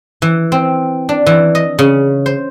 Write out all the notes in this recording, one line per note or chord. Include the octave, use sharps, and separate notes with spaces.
E3
C4
D4
E3
D#5
C#3
C5